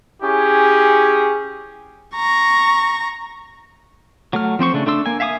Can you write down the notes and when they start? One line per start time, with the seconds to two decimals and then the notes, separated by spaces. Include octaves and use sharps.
0.22 C#4 E4 G4 G#4
2.16 A#5 C#6
4.33 F#3 A3 F6
4.59 F3 C4 C5 C#6
4.74 C#3 A3 D4
4.86 A3 D4 C6 E6
5.06 A#3 G#5
5.20 E5 F5 G#5 D6 D#6